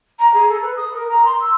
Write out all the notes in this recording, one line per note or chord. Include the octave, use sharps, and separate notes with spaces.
A#5
G#4
A4
B4
D#6
A#4
A#5
C6
E6